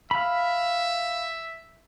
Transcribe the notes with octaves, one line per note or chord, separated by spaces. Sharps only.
E5 F5 B5